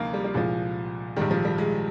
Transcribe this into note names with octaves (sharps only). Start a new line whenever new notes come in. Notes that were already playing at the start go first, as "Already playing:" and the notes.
Already playing: D2 C3 F3 A#3 D#4 F4
G3
G3
C2 A#2 F3 G#3
A#1 G#2 D#3 G3
F3
G3
G#3